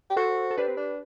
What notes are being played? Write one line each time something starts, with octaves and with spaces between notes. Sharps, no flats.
G4
F#4 A4 C5
A4
D4 G4 B4
C4
D4